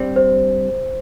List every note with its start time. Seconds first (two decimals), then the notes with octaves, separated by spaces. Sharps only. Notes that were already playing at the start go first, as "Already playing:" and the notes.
Already playing: G2 G3 C4
0.16 C5